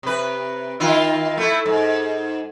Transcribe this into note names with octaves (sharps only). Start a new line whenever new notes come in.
C3 B4
D#3 E4 F4
A3 E4
G#2